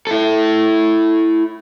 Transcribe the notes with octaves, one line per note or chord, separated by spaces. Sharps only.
E4 A4